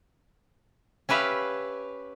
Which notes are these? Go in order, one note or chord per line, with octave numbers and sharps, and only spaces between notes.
C#4 G4 B4 E5 F5